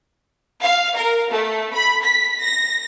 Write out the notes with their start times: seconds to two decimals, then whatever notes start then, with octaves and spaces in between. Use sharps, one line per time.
0.61 F5
0.95 A#4
1.30 A3
1.73 B5
2.03 B6
2.41 A#6